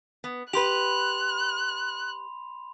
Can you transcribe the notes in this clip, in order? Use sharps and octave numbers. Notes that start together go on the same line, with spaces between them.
B3
G4 B4 B5 C6 F#6 F7